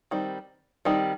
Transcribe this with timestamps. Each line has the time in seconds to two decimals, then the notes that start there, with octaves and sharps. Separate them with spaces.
0.11 D#3 G3 C4
0.85 D#3 G3 C4